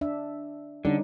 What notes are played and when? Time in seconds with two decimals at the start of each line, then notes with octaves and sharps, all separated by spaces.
0.01 D4 E5
0.85 D3 G3 C#4 D#4